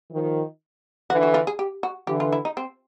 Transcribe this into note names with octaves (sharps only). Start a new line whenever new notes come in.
D#3 F3
D3 E3 F#4
F#4
F4
G#4
G4
F#4
D3 E3 G4
F4
E4
D#4
C4